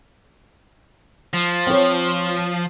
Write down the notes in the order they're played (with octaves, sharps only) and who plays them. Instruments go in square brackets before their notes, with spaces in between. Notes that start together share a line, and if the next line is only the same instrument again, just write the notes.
[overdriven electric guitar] F3
[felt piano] C4 C#5